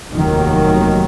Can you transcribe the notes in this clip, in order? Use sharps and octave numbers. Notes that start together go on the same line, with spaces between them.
F1 D#2 D#3 F#3